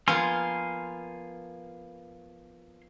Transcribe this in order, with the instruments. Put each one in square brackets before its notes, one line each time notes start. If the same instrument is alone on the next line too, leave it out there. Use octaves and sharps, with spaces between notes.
[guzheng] F3 A#3 B3 [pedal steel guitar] G#5 C6 F6